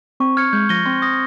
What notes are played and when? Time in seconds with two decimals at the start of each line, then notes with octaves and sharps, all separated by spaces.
0.20 C4 C#6
0.37 F6 G#6 C#7
0.53 G#3 G6
0.69 F3 A#6 D#7 G7
0.86 C4 C6
1.02 D#6 A#6